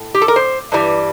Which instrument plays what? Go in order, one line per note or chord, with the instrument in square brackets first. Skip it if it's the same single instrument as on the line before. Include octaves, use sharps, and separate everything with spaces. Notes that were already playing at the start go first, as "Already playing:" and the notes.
Already playing: [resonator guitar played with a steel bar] A2
G4
A4
A#4
C5
G2 E3 G3